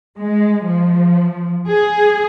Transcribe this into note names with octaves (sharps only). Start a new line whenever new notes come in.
G#3
F3
G#4